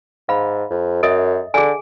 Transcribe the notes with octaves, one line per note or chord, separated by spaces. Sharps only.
G#2 F5 B5
F2
F#2 A4 D#5 E5
D3 G#4 G#5